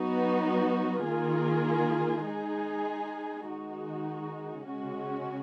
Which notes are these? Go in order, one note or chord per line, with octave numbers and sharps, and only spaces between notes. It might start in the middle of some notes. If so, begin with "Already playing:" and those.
Already playing: F#3 B3 D#4 F#4
D#3 A#3 F4 G#4
G#3 D#4 G#4
D#3 G#3 D#4 F#4
C#3 G#3 C#4 F#4